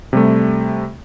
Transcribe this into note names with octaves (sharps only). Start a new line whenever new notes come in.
C3 G3 A3